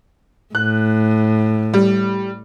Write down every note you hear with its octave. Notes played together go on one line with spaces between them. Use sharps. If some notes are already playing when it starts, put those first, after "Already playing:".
A2 F#6
G3